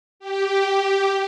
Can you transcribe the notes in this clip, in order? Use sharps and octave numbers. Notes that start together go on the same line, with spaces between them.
G4